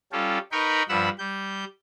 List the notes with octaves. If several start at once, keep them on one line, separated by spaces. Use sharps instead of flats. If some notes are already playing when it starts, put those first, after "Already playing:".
G3 C#4 F4 G4 A4
D#4 A#4 B4 G5 B5 C#6
G2 F3 F#5 B5 E6
G3 G6